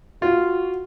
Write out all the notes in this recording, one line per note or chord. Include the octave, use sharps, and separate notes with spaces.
F4 F#4